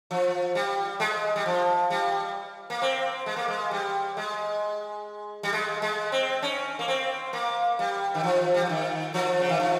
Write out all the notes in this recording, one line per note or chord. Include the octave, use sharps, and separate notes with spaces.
F3
G3
G#3
G3
F3
G3
A#3
C4
G#3
A#3
G#3
G3
G#3
G3
G#3
G#3
C4
C#4
A#3
C4
A#3
G3
D#3
F3
G3
F3
D#3
F3
C#3
D#3
F3